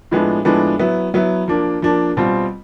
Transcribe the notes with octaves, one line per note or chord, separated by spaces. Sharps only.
A2 F3 G#3 B3 D4
A2 F3 G#3 B3 D4
F#3 B3 E4
F#3 B3 E4
F3 A#3 D4
F3 A#3 D4
B2 G3 C4 F4